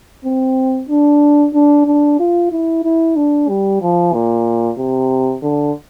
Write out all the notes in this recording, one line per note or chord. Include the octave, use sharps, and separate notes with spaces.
C4
D4
D4
D4
F4
E4
E4
D4
G3
F3
A#2
C3
D3